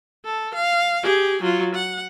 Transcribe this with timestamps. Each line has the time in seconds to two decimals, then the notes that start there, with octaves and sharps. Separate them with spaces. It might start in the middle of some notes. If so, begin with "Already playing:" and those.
0.25 A4
0.54 F5
1.03 G4 G#4
1.42 F#3 F4
1.75 F#5